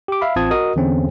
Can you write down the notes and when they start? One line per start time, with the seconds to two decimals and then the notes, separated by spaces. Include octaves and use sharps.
0.08 G4 D6
0.21 E5 F5 B5
0.36 A1 C4 F4 A5 D#6 G#6
0.51 F#4 A#4 D#5 D#6
0.76 E2 D3 C4 C#4